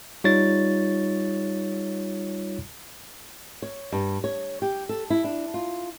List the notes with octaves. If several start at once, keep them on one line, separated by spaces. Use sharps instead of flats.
G3 D#4 F4 C#5 A6
C#5
G2
C#5
G4
A4
E4
D4
F4